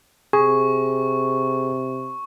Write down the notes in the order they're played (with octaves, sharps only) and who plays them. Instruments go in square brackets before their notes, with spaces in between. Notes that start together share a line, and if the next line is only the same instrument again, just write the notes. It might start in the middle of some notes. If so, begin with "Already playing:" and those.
[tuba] C3 [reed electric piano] G#4 [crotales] C#6